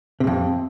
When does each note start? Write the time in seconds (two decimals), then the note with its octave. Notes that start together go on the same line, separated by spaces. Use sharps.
0.20 C3
0.24 A2
0.27 F2